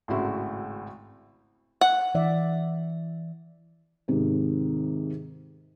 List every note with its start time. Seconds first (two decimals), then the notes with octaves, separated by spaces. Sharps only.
0.08 G#1 A2 C#3 E4 F#4 C6
1.81 F#5
2.15 E3 D5 E5
4.08 G#2 C3 D#3